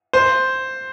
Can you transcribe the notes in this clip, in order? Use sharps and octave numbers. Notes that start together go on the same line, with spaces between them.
C5